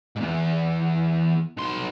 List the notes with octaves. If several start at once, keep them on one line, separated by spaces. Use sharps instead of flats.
E2 G#2
B1 C6